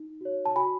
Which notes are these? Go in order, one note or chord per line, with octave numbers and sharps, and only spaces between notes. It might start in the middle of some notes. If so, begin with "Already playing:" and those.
Already playing: D#4
F#4 C#5
A5
F#4 G#5 B5